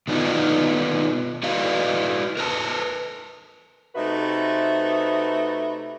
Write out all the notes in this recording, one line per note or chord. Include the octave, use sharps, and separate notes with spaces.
B2 D#3 B3 D4 D#4 F4
E4 F#4 B4 D5 D#5 F5
A#4 B4 A5
C3 A3 D#4 F#4 B4 E5